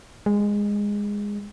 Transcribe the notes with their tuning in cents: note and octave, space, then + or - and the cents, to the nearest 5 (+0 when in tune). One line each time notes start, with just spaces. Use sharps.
G#3 -15